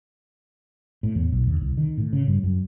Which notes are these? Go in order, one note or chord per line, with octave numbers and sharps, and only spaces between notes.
A2
E2
B1
D#2
C2
D#3
A2
C#3
G2
F#2